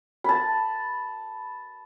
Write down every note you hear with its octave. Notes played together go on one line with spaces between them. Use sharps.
A5 B5